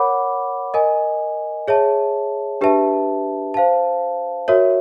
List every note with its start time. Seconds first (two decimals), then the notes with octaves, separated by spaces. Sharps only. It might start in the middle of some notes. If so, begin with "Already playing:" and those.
Already playing: A#4 C#5 F#5 B5 D6
0.74 A#4 D#5 G#5
1.68 G#4 C#5 E5 A5
2.61 D4 G4 B4 E5 A5
3.54 C5 F5 A5
4.48 F#4 A#4 C#5 E5